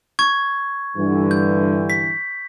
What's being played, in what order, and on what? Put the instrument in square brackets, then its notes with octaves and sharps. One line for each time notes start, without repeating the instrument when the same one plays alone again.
[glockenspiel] C#6 G#6
[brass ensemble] G2 D3 E3
[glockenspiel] G6
B6